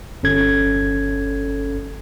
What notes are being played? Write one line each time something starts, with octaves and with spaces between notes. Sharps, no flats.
G1 C#4 A4 G#6